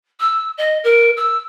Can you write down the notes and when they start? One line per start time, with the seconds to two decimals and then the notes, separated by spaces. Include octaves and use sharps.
0.20 E6
0.58 D#5
0.84 A#4
1.17 E6